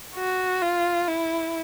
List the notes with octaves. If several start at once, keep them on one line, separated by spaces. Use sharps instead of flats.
F#4
F4
E4